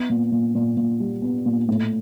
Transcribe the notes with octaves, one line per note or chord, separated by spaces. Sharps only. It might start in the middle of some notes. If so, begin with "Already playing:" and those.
Already playing: B3
A#2
A#2
A#2
A#2
G3
B3
A#2
A2